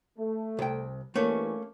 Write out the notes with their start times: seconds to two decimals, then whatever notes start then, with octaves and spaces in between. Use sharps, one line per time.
0.18 A3
0.59 C2 G5
1.15 G2 E3 A3 A#3 C#4